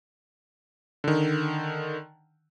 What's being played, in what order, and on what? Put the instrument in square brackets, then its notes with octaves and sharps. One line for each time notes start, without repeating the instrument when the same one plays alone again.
[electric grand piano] D3 D#3